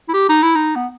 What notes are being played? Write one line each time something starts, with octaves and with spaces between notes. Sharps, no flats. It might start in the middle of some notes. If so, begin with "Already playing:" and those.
E4
G4
D#4
E4
D#4
B3